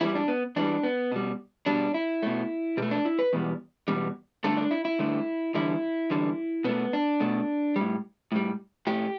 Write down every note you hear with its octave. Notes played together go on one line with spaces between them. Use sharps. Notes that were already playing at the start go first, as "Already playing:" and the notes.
E2 E3 G3 E4
D4
B3
E2 E3 G3 D4
B3
B2 G3
B2 G3 D4
E4
B2 A3
B2 A3 G4
D4
E4
B4
E2 B2 G3
E2 B2 G3
G2 D3 A3 A4
D4
E4
E4
G2 D3 A3
E2 D3 G3 E4
E2 D3 G3
B2 A3 B3
D4
B2 A3
A2 G3
A2 G3
A2 A3 G4